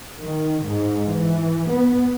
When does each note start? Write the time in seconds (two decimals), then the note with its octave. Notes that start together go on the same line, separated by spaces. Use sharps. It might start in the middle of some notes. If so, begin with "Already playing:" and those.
0.20 D#3
0.65 G#2
1.08 E3
1.71 B3